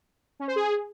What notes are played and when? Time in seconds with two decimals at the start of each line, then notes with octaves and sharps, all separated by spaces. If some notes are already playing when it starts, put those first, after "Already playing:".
0.40 C#4
0.48 C5
0.56 G#4